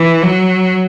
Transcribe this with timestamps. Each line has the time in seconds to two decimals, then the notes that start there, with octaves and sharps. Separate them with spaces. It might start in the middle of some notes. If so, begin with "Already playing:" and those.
Already playing: E3
0.23 F#3